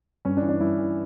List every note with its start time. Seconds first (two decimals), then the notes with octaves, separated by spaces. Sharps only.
0.25 G2 C#4
0.37 D4
0.42 E3
0.49 D4
0.60 G2 E4
0.78 E3